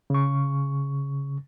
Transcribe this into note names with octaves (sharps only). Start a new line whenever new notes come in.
C#3 C#6